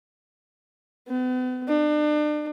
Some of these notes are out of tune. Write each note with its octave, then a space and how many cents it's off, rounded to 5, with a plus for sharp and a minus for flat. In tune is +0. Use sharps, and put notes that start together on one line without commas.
B3 +40
D4 +35